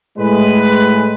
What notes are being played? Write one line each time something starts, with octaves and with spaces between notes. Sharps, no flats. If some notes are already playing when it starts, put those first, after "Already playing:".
A2 G#3 B4